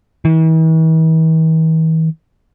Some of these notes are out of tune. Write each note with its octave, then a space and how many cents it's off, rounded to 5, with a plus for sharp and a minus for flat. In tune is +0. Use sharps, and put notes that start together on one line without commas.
E3 -45